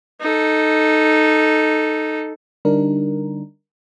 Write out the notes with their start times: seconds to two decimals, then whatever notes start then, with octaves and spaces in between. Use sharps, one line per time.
0.21 D#4 A4
2.65 D3 G3 D4 D#4 A#4